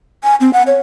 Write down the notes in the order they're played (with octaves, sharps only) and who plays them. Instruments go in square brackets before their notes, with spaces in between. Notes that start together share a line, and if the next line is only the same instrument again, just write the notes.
[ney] G#5
C4
F#5
C#5